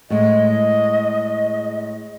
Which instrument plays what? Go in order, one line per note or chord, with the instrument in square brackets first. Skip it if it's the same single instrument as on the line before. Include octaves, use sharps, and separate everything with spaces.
[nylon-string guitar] A2 G#3 [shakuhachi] D#5